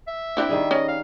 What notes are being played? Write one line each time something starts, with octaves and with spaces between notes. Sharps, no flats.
E5
C4 D4 E4
D#3 G3 G#4
C#4 D#5
F5